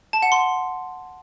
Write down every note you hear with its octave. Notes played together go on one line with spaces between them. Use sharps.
A5
F#5
C6